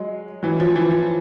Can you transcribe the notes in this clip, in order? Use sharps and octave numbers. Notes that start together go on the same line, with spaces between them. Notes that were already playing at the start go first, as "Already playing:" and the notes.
Already playing: F#3 G#3
E3 F#3
F3
E3
F3